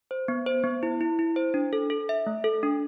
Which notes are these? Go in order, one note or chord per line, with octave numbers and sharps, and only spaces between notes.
C5
B3
C5
B3
E4
E4
E4
C5
D4
A4
A4
E5
A3
A4
D4